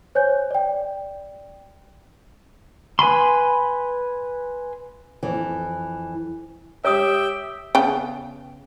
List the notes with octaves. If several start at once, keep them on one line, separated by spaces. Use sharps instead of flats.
C5 C#5 G#5 G6
D5 G5
B4 G#5 B5 C6
F2 E3
G4 C#5 E5 G5 D#6
C#3 B3 G5